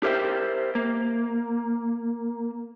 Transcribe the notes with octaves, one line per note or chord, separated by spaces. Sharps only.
G4 A#4 C5 E5 G5
A#3